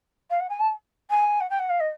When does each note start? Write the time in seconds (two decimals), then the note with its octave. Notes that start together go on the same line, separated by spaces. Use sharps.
0.30 F5
0.40 F#5
0.49 G#5
0.60 A5
1.10 G#5
1.40 F#5
1.50 G5
1.59 F#5
1.69 F5
1.80 D#5